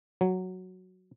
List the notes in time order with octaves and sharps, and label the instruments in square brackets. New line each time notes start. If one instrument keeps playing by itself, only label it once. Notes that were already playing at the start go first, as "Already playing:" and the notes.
[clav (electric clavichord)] F#3